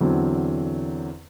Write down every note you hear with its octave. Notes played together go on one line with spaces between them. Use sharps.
E2 D3 F#3 C4